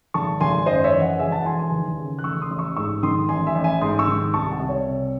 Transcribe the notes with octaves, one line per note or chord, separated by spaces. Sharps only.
G#1 A5 C#6
G#1 G#5 C6
F#2 C5 D#5
C#5 E5
E3
D#5 F#5
E1 E5 G#5
F#5 A5
E3 G#5 C6
G#5 C6
D#2
C#3
F#6
A1 C#6 E6
C6 D#6
A1
C#6 E6
G#2 C#6 E6
D#3 C6 D#6
A1 G#5 C6
E5 G#5
A1
E5 G#5
G#2 C6 D#6
C#6 E6
D#3
C2 A5 C#6
F#5 A5
C2
C#5
C3